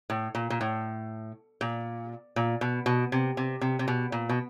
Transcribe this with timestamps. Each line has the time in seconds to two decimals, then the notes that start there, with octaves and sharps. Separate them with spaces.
0.10 A2
0.35 A#2
0.50 A#2
0.61 A2
1.61 A#2
2.36 A#2
2.61 B2
2.86 B2
3.12 C3
3.37 C3
3.61 C3
3.79 C3
3.88 B2
4.12 A#2
4.29 B2